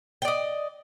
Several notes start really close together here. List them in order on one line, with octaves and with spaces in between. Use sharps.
G5 D5 D#5